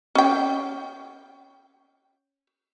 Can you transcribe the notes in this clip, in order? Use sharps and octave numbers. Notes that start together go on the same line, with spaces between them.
C#4 G5